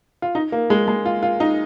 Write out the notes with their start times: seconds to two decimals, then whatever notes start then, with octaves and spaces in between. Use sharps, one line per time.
0.22 F4
0.35 D#4
0.52 A#3
0.70 G#3
0.88 G#3
1.05 F4
1.23 F4
1.40 D#4